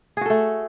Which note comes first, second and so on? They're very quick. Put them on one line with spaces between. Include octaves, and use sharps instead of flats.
G#4 F#4 A4 A3